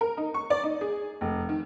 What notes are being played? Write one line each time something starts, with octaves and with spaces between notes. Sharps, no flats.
A#4
D#4
C#6
D5
D#4
G#4
F1
D#3